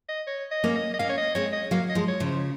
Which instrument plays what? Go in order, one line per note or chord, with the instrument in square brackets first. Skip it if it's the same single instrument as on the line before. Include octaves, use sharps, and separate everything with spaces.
[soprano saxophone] D#5
C#5
D#5
[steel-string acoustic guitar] A#3 C#4
[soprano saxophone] D#5
D#5
[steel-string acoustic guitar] A#3 C#4 [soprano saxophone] F5
[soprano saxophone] C#5
D#5
[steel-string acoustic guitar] G#3 C4 [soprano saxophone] C#5
[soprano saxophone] D#5
[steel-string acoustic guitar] F#3 A#3 [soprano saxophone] F5
[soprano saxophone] D#5
[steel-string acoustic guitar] F3 G#3
[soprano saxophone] C#5
[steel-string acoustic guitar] C#3 F3
[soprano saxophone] C5